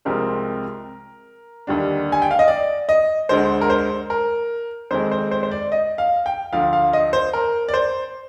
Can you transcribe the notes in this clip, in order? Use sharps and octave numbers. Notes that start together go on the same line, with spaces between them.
C2 C3 F3 G#3 C4 A#4
D#2 D3 G3 D4
G#5
G5
F5
D#5
D5
D#5
D2 D3 G#3 C5
A#4
C5
A#4
F2 D#3 G#3 C4 C5
C5
C5
C5
D5
D#5
F5
G5
D2 D3 F3 F5
F5
D#5
C5
A#4
D5
C5